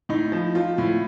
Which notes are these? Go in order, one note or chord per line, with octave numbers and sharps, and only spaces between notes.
A2 D#4
F3
F3 F4
A2